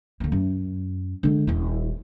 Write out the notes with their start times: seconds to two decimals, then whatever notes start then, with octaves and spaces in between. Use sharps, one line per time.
0.20 D2 A#3
0.32 F#2
1.23 D3 G#3
1.47 D#1 E4